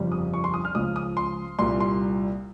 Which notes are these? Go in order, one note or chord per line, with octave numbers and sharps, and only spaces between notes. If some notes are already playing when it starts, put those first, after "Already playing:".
Already playing: G1 F2 C#3 G3
D#6
C#6
C6
D#6
F6
C#2 C#3 F3 D#6
D#6
C6
C2 A#2 G3 C6
C6